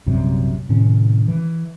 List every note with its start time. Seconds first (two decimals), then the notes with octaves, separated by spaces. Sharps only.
0.06 A#1 F#2 C3 G3
0.69 A2 C3 D#3 C#4
1.28 E3